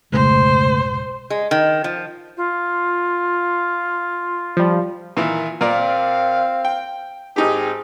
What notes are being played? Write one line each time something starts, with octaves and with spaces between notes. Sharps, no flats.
F1 B1 F2 G#2 C#3 A3 C5
G#3
D#3
F3
F4
F3 G3
A#2 D#3 E3
A#2 C4 A#4 D5 F5
G5
G#1 C4 D#4 G4 G#4